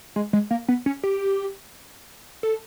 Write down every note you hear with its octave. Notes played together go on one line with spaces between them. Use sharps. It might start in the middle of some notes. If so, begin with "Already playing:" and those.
G#3
G#3
A#3
B3
C#4
G4
A4